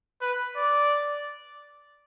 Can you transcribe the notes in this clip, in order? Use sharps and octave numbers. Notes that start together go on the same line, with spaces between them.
B4
D5